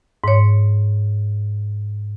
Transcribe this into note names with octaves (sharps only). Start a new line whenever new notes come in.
G#2 C#5